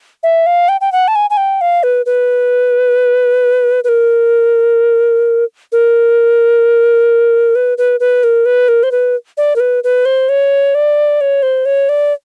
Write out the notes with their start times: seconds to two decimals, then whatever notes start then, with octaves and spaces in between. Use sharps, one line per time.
0.23 E5
0.46 F5
0.69 G5
0.81 G5
0.92 F#5
1.08 A5
1.16 G#5
1.30 G#5
1.37 G5
1.61 F5
1.83 B4
2.06 B4
3.84 B4
3.89 A#4
5.72 A#4
7.55 B4
7.78 B4
8.00 B4
8.24 A#4
8.46 B4
8.68 A#4
8.83 C5
8.92 B4
9.37 D5
9.56 A#4
9.60 B4
9.84 B4
10.05 C5
10.29 C#5
10.75 D5
11.21 C#5
11.43 C5
11.65 C#5
11.89 D5